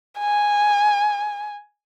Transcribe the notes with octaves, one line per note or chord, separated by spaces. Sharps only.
G#5